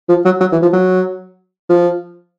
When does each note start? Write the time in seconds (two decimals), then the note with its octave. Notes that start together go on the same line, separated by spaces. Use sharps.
0.09 F3
0.25 F#3
0.41 F#3
0.52 E3
0.62 F3
0.73 F#3
1.69 F3